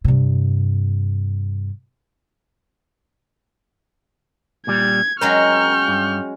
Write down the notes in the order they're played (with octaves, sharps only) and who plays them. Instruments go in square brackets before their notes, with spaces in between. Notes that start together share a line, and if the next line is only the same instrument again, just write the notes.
[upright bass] G2 C3
[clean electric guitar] A#2 G3 [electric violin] G#6
[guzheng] F#3 G#3 C#4 [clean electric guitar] A#4 [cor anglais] G5 [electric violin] C#6 F6
[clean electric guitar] G2